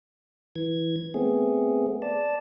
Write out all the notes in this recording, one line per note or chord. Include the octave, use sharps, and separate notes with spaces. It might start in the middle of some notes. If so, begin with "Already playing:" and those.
E3 G#6
A3 B3 C4 G#4
D5 A5